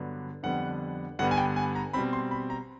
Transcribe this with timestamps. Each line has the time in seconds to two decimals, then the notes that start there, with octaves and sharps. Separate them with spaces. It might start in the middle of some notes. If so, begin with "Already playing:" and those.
Already playing: G2 D3 F#3 B3
0.43 F2 D3 G3 B3 D4 F#5
1.19 G2 D3 G3 B3 F#5
1.31 G#5
1.37 G5
1.56 G#5
1.75 A#5
1.93 B2 G3 C4 B5
2.13 C6
2.31 B5
2.50 A#5